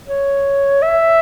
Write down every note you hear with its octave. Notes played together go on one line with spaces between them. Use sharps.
C#5
E5